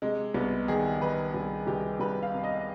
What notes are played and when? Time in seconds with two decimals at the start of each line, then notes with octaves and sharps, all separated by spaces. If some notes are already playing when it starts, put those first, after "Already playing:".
0.02 C3 G#3
0.34 C2 B3
0.68 D#3 G#4
1.01 D#3 B4
1.34 C2
1.67 C2 G4
2.00 C2 B4
2.23 F5
2.34 C3
2.44 D#5